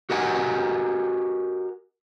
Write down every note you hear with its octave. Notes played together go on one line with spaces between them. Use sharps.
F#4 G4 A#4 D#5 F#5 G#5